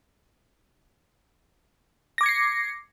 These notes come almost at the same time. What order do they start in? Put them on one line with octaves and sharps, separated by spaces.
A#6 D6 G#6 C#7 C7